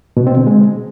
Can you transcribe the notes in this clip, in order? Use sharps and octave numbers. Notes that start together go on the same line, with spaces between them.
B2
C4
D3
G#3